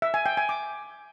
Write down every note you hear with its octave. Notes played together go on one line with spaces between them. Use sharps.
E5
G#5
G5
G#5
D6